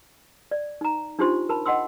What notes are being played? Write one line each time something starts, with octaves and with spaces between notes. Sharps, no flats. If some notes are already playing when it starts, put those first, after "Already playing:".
D5
D#4 A#5
D4 D#4 F4 G4 C5 C6
A#4 A5 B5
D#5 F#5 G5 C6 E6